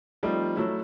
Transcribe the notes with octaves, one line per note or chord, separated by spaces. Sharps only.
F3 G3 A3 C4 D#4 F4
F#3 A3 E4